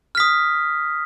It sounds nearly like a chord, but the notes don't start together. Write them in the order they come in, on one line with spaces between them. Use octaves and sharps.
F6 B6 D#6